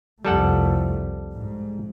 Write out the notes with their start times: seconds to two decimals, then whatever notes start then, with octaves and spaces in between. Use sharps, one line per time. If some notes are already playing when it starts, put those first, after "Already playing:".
0.25 C2 F2 G3 A3 A4 F#5
1.34 G#2